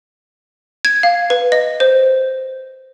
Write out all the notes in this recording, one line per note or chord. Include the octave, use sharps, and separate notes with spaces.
G#6
F5
B4
D#5
C5